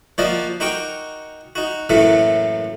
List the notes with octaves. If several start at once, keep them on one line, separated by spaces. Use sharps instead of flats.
F3 A#3 F#4 D5 D#5 F5
D#4 F#4 A#4 G5 C#6 D6
D#4 F#4
F#2 A2 E3 F#3 A3 A#3